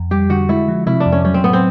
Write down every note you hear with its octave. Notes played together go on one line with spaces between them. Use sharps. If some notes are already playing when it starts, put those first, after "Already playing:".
Already playing: F2
G3 G4
D3 F#4
G#3 E4
F3
C3 E4
D4
F2
C#4
F#3 C#4
C4
A2 B3
C4